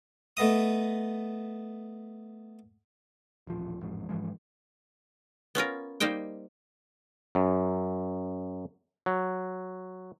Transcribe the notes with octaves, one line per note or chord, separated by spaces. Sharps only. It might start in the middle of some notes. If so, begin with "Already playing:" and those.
A3 B3 D#5 D#6
D#1 A1 F3
A1 F2 G#2
G#2 E3 F3 G#3
B3 C#4 F4 A#4
G3 A#3 D#4 C5 G5
F#2
F#3